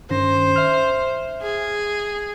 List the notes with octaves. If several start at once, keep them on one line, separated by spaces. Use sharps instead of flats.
G2 D#3 C#4 C5
E5 F6
G#4